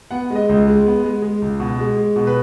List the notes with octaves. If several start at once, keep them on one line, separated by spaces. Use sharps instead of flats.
B3 F#5
G#3
D#5
C#2
G#3
B3
G#3
G#3
C#2
B2
G#3
G#3
B2
B4